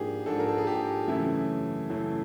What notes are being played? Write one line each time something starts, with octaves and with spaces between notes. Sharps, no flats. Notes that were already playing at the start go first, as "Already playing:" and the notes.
Already playing: G#2 F3 A#3 D4 G4 G#4
G#2 F3 A#3 D4 A4
A#4
A4
G#4
G4
F#2 C#3 E3 A3 E4
F#2 C#3 E3 A3